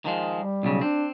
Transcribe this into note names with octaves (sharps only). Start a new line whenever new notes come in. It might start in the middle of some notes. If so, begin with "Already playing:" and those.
D#3 F3 G#3
G3
B1 C#3
C4 D4